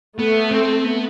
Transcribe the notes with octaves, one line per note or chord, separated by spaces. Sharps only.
A3 B3
C4
B3